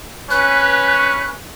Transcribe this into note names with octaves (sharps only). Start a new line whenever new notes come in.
C#4 B4 F#6